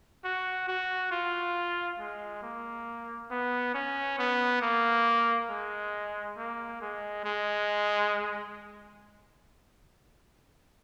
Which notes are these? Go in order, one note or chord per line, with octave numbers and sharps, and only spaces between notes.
F#4
F#4
F4
G#3
A#3
B3
C#4
B3
A#3
G#3
A#3
G#3
G#3